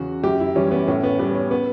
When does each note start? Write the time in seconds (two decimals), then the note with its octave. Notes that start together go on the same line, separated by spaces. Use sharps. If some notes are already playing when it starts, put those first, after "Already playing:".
Already playing: E2 C#3 F#4
0.23 F#2 G4
0.40 E4
0.56 E3 G3 C#4
0.71 B3
0.88 A2 C#4
1.03 B3
1.19 G3 B3
1.35 C#4
1.51 B3